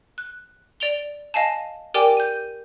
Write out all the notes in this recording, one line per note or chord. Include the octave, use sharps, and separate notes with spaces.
F#6
D5 D7 F7 G7
D#5 F5 G#5 A5
G4 A#4 D5 G5 G#5 D6
G6 D#7